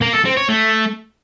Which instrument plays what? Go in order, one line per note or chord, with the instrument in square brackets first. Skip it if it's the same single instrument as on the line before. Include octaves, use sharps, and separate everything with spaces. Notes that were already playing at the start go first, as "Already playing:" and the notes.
[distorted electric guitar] A#3
A4
C4
C#5
A3